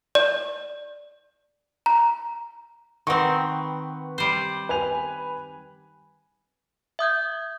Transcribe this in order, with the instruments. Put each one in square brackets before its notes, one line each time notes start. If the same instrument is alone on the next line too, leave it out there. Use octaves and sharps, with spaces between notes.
[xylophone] D5
A#5
[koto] D#3 C4 [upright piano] B4 F#5 C#6
[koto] G3 C5
[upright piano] B4 G#5 F7
[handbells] E5 D#6 G6 G#6